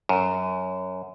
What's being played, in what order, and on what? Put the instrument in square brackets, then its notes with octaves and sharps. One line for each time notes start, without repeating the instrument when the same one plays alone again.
[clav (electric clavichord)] F#2